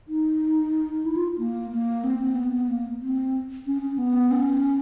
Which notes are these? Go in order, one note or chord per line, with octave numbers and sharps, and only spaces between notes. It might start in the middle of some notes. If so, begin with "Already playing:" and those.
D#4
E4
F4
A#3
A#3
C4
C4
B3
B3
A#3
C4
C#4
C#4
B3
C#4